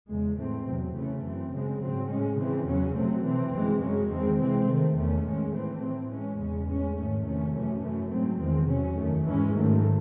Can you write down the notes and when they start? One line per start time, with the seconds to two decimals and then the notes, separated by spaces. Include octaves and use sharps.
0.09 E2 C#3 G#3
0.38 A2 E3 A3 C4
0.66 E2 C3 F#3
0.95 C#3 E3 A3 C#4
1.24 F#2 E3 C4
1.52 C#3 G#3 C4
1.81 G#2 F#3 C4
2.10 A2 G#3 C#4
2.38 C#3 E3 C4
2.67 E2 C#3 F#3 C#4
2.95 C3 F#3 A3 C4
3.24 C3 E3 C4
3.52 F#2 E3 G#3
3.81 F#2 C#3 G#3 C#4
4.10 E2 D#3 G#3 C4
4.39 C3 E3 G#3 C4
4.68 C3 D#3 A3
4.96 E2 D#3 A3 C#4
5.25 A2 G#3 C#4
5.53 A2 E3 A3 C4
5.82 A2 E3 C4
6.10 A2 G#3 C#4
6.39 E2 C#3 G#3 C#4
6.68 A2 G#3 C#4
6.96 G#2 D#3 A3 C#4
7.24 E2 C3 D#3 A3 C#4
7.54 F#2 E3 A3 C#4
7.82 F#2 E3 A3 C#4
8.10 G#2 F#3 A3 C4
8.39 E2 D#3 G#3 C4
8.69 C3 F#3 C#4
8.96 F#2 D#3 A3
9.25 G#2 E3 G#3 C#4
9.53 G#2 D#3 F#3 A3